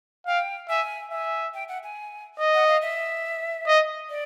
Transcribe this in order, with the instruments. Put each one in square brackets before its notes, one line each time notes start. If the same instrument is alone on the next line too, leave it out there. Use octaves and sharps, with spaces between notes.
[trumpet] F5 [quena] G5
[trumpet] E5 [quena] G#5
[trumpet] E5 [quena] G#5
[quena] G5
F#5
G#5
[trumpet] D#5
[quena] F#5
F5
E5
[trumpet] D#5
[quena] D5